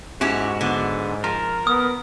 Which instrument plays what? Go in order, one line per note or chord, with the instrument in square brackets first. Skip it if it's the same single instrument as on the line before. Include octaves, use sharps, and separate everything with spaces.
[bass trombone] G#2 [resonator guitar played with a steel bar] C#4 E4 G4 [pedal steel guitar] F#4
[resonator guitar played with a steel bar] D3 B3
[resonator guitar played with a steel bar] F3 [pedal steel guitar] A#4
[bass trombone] B3 [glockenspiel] D#6